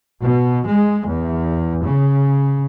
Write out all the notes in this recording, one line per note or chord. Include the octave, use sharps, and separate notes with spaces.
B2
G#3
E2
C#3